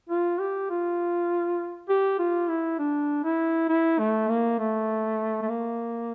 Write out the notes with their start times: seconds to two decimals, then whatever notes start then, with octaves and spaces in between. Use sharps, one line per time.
0.10 F4
0.40 G4
0.70 F4
1.89 G4
2.19 F4
2.49 E4
2.79 D4
3.24 E4
3.69 E4
3.99 A3
4.28 A#3
4.59 A3
5.42 A3
5.49 A#3